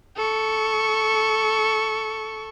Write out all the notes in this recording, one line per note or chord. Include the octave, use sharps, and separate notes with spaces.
A4 C#6